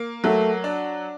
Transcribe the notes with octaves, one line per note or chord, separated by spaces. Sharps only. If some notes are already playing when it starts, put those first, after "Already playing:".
Already playing: A#3
F#3 A3
D4